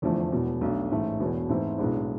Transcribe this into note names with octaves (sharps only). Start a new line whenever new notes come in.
F1 E2 D3 F3 A3
E1 E2 B2
B1 B2 A3 D4
A1 G#2 E3 A3
E1 E2 B2 B3
G#2 E3 A3 C4 E4
B1 A2 G#3 B3 D4